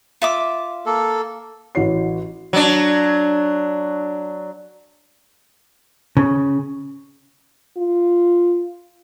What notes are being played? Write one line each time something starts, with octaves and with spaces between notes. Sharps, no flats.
F4 E5 D6
A#3 A4
A1 E3 F#4 C#5 C7
F#3 D4
C#3
F4